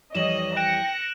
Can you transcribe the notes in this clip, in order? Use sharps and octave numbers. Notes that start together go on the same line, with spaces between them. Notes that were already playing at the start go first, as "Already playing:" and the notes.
F2 E3 G3 C#5 D#5 E7 F#7
G5 F#6 A#6 C#7 D7 E7